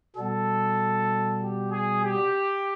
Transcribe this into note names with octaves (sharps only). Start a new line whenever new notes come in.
B2 G3 B3 A4
G4
G#4
G4